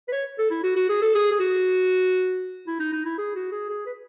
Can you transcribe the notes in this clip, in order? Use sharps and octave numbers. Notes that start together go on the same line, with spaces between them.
B4
C#5
A4
E4
F#4
F#4
G#4
A4
G#4
G#4
F#4
E4
D#4
D#4
E4
G#4
F#4
G#4
G#4
B4